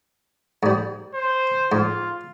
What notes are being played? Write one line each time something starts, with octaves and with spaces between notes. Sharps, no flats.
G#2 G3
C5
G#2 F4